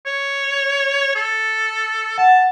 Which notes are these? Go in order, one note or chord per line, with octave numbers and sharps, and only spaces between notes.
C#5
A4
F#5 A5